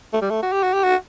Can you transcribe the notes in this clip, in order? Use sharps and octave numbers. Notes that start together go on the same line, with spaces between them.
A3
G3
A3
F#4
G4
F#4
G4
F#4